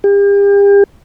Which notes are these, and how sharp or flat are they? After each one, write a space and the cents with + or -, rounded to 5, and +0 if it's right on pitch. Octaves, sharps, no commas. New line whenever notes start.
G4 +40